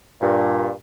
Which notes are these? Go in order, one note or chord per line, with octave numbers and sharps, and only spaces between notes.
G2 A#2